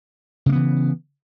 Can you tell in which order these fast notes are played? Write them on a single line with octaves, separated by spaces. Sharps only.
C#3 A#3 B3 E3